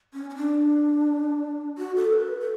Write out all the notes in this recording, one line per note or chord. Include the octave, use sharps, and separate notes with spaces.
C#4
C#4
D4
F#4
A4
B4
A4